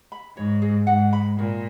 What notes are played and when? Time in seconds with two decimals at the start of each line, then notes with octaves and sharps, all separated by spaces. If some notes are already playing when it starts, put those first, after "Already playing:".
0.12 B5
0.37 G#2 C#5
0.62 G#4
0.87 G#2 F#5
1.13 B5
1.38 A#2 A#4